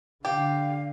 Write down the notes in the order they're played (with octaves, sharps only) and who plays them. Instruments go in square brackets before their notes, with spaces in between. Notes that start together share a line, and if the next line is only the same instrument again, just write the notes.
[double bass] D3 [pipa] G4 [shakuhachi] F5